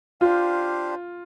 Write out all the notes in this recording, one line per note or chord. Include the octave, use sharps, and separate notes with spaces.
D4 F4 G4 C5 F5